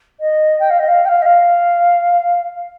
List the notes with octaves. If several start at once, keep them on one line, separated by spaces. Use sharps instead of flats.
D#5
G5
F5
D#5
F5
G5
F5
D#5
F5